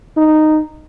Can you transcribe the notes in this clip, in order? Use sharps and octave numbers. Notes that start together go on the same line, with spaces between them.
D#4